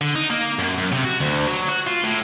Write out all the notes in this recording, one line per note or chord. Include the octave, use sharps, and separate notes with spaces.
D3
D#4
A#3
F#2
F#2
C3
F#4
D2
F#3
F#4
F4
A2